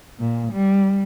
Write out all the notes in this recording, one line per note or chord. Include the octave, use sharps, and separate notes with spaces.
A#2
G3